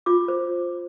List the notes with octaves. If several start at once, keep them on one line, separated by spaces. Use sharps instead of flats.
F4 D6
C5